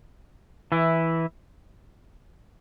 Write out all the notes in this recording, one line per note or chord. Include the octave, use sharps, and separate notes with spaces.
E3 E4